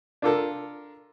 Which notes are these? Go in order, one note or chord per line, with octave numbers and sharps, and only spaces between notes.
D4 F4 A4 A#4